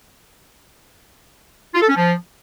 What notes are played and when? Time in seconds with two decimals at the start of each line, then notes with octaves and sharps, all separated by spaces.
1.75 F4
1.82 A4
1.89 C#4
1.96 F3